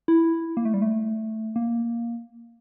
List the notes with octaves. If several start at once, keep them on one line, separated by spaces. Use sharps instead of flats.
E4
A#3
A3
G3
A3
A#3